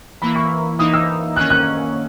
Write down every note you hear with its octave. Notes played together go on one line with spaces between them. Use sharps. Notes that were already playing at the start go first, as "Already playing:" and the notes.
E3 A#3 E4 B5
C#6
E3 A#3 D#4 D#6
E6
D#3 A#3 C#4 F#6
F#6